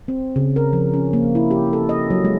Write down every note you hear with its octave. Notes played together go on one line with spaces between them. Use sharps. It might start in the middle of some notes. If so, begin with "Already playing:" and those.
C4
C#3
A#4
F3
C#4
A#3
E4
G4
A4
D#5
F#3
G#3